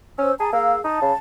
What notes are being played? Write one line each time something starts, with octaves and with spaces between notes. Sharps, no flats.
C#4 C5 E6
G#4 A5 A#5
A#3 G#4 F5 E6
D#4 A5
C#3